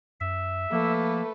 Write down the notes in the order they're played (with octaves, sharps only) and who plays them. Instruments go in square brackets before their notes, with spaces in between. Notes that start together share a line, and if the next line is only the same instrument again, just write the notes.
[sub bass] F#2 [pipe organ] E5
[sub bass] F3 [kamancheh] A3 B4 [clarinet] A#3